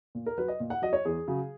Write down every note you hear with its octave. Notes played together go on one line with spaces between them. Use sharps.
A#2
A#4
F#3 B4
D#5
A#2
F#5
F#3 D#5
C#5
E2 G#4
C#3 F#3